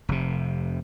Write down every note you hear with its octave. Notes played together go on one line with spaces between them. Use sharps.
F1 C3